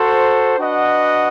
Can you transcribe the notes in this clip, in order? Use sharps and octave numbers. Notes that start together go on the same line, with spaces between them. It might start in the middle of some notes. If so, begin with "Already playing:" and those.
Already playing: F#4 A4 C5
D4 F#4 B4 D#5 F#5